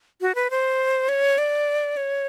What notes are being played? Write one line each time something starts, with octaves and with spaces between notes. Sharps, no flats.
F#4
B4
C5
C#5
D5
C#5